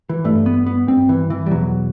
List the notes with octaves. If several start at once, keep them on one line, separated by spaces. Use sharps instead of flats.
E3
G2 A3
B3
B3
G2 C4
E3
E3
G3
E2 B2 F#3